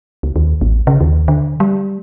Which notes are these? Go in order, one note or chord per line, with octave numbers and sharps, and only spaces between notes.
C#2
D#2
A1
C#3
D#2
D3
G3